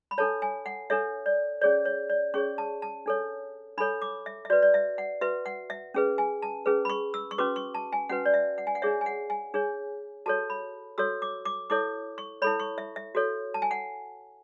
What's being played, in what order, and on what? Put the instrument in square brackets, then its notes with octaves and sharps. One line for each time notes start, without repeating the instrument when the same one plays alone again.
[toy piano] B5
D4 A4 C#5 A5
G#5
F#5
D4 A4 C#5 E5
D5
C#4 G#4 C#5 D5
C#5
D5
C#4 G#4 C#5 C#6
A5
A5
D4 A4 C#5
D4 A4 C#5 B5
D6
E5
E5
F#4 B4 D5
D5
E5
F#5
F#4 B4 E5
F#5
E5
C#4 G#4 B4
G#5
A5
C#4 G#4 B4
B5
C#6
E6
C#6
C#4 F#4 B4 D6
C#6
A5
G#5
C#4 F#4 B4 F#5
D5
E5
F#5
G#5
F#5
D4 G#4 C#5 E5
G#5
F#5
G#5
D4 G#4 C#5
F#4 A4 C#5 A5
B5
F#4 A4 C#5 E6
D6
D6
E4 A4 C#5 D6
C#6
E4 A4 C#5 B5
C#6
E5
E5
F#4 A4 C#5
A5
G#5
F#5